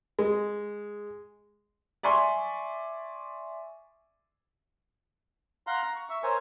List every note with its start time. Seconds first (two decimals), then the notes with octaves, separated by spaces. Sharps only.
0.19 G#3
2.03 D5 E5 G#5 C6 C#6
5.67 F5 F#5 A#5 C6
5.82 A#5
5.96 C#6
6.09 E5 C#6
6.23 A#4 C5 C#5 G#5